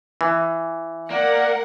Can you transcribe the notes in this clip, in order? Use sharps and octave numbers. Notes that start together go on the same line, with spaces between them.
E3
A#3 A#4 D5 F#5